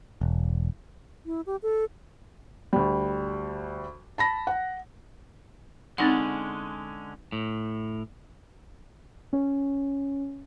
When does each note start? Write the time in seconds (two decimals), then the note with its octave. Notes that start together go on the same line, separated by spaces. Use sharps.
0.21 E1
1.26 E4
1.46 G4
1.62 A4
2.73 D2 G3
4.18 A5 B5 A#6
4.47 F#5
5.98 D3 G#3 C4 C#4 D#4 F#5
7.32 A2
9.33 C#4